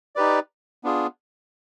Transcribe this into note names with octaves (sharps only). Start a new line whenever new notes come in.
D#4 G4 B4 D5
B3 D4 F4 G#4